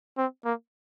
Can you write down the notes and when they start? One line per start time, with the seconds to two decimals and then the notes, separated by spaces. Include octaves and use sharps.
0.18 C4
0.45 A#3